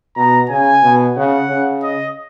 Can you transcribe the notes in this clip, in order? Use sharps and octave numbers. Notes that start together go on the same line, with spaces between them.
B2 A#5
C#3 G#5
B2
C#3 F#5
C#3
D#5